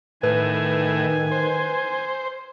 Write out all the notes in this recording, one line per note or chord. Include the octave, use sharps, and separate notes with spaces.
A2 D#3 B4 G#5
C5